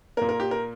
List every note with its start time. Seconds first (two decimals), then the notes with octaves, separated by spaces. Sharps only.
0.17 A#2 A#3 A#4
0.29 A#4
0.40 G4
0.51 A#4